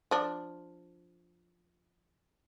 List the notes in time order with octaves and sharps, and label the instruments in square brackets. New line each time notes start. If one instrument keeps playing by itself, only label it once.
[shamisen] F3 D4